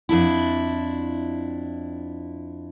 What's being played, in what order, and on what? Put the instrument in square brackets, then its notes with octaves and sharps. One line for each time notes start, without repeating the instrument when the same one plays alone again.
[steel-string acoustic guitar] F2 D4 E4